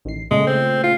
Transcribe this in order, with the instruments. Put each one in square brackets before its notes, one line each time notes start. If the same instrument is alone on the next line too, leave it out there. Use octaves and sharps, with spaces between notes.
[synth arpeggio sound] A1 D#3 C7
[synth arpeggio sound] A#2 C#3 A3 [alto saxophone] G#3
[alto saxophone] C4
F4